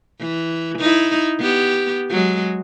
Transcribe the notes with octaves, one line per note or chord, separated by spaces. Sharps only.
E3
D#4 E4
B3 G4
F#3 G#3